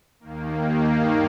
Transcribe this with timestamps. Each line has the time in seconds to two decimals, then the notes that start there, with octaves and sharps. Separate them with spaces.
0.20 D#2 D#3 A#3
0.92 G2 D#3